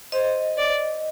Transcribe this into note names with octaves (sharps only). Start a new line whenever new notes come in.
C5 D#5
D5